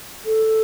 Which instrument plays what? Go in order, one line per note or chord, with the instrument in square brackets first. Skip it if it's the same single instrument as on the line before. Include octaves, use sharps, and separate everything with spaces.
[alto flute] A4